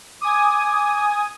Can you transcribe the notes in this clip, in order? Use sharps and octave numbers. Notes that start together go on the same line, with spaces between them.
G#5 D6 D#6